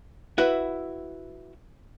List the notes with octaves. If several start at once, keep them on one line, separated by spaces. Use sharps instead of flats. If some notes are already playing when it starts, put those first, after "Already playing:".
E4 F#4 B4 E5